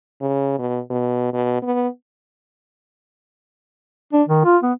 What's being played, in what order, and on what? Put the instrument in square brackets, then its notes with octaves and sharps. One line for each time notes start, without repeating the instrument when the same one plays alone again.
[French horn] C#3
B2
B2
B2
B3
[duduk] D4
D#3
F4
B3